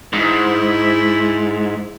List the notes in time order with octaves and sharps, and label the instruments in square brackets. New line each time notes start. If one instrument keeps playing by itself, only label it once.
[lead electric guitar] G#2 [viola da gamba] E4